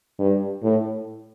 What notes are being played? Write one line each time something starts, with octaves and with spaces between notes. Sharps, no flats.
G2
A2